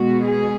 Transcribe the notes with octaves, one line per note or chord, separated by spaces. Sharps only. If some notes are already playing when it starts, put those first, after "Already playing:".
Already playing: B2 G#3 B3 F#4
G#4